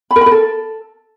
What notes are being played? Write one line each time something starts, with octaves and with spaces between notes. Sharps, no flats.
B5
A#4
B5
A#4
A4